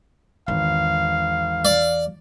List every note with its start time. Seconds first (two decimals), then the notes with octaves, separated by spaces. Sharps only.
0.48 G#1 E2 F5
1.65 D5